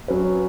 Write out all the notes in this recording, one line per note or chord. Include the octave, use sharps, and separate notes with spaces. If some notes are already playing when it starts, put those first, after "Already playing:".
F#3 C#4 F#4 B4